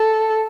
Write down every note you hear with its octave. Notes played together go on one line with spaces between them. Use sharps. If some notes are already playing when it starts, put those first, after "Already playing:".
Already playing: A4